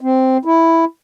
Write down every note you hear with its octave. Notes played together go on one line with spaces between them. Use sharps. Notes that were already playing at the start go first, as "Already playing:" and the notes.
C4
E4